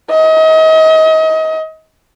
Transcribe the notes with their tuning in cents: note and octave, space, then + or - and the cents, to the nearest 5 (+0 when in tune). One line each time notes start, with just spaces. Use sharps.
D#5 +35